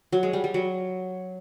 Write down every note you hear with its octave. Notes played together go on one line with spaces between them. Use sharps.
F#3
G#3
G3
G3
F#3